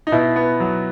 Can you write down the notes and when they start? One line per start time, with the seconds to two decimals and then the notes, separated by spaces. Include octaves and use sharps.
0.07 D#4
0.12 B2 E4
0.36 B3
0.60 F#3